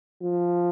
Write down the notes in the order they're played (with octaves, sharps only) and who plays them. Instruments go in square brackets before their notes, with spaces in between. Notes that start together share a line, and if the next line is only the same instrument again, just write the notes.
[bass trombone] F3